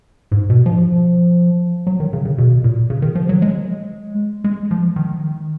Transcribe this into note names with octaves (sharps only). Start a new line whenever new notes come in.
G#2
B2
F3
F#3
D#3
C#3
C#3
B2
A#2
C#3
D#3
F3
F#3
G#3
G#3
F3
D#3